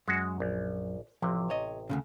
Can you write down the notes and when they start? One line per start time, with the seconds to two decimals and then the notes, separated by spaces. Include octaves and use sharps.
0.08 F#2 G#3 F#4
0.40 A#1
1.22 A1 C3 F3
1.50 C#5 D#5
1.89 D2 A#2 C#3